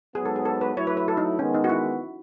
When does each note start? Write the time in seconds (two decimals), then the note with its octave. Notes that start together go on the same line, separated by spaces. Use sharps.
0.15 G#2 F#3 B3 G#4
0.25 A4
0.36 G#4
0.45 A4
0.61 B4
0.77 F#3 A3 E4 C#5
0.87 B4
0.97 B4
1.08 A4
1.17 D#4
1.39 D#3 G#3 B3 C#4
1.54 D#4
1.64 F#4
1.69 E4